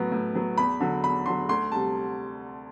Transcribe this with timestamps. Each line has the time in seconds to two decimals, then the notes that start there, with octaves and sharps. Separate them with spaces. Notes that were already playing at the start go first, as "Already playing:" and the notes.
Already playing: A2 F#3 B3
0.12 A2
0.35 F#3 B3
0.58 E2 B5
0.80 D3 F#3
1.03 E2 B5
1.26 D3 F#3 C6
1.49 D2 C6
1.72 C3 G3 A5